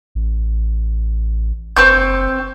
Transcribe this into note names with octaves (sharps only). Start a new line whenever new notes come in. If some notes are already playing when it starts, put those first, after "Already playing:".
A1
F#1 C4 C#6 G6